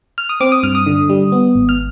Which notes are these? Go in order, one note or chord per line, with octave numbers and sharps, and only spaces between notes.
F6
D#6
C4 D6
D#6
G2 F6
D#6
D3
G3
B3
G#1
F6